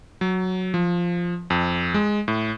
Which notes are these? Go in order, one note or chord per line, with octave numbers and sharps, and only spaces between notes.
F#3
F3
F2
G#3
A2